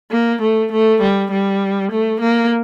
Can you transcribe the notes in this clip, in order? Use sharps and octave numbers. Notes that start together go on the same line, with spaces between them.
A#3
A3
A3
G3
G3
A3
A#3